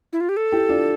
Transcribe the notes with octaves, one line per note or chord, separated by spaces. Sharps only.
E4
F4
G4
A4
E4 G4
D4 F4